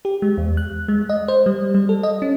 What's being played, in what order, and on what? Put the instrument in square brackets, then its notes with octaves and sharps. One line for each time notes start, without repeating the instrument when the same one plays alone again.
[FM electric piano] G4
G#3
E2
F#6
G#3
D#5
C5
G3
G3
A4
D#5
C#4